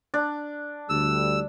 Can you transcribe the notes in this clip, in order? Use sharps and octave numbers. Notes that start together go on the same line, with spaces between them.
D4
D2 G3 E6